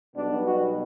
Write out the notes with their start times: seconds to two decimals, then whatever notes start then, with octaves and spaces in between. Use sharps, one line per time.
0.15 B1 B2 G3 B3 D4
0.47 F#4